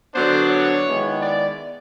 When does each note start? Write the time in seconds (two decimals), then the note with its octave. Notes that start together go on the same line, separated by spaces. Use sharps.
0.14 D3 F#3 B3 D4 C5
0.50 C#5
0.86 D#3 G#3 B3 E4
1.22 D5